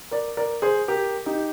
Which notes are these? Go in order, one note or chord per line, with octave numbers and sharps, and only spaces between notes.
A#4 D5
A#4 D5
G#4 C5
G4 A#4
D#4 G4